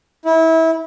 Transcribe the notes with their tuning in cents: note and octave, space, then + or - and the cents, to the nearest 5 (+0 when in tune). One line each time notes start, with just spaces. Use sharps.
E4 -25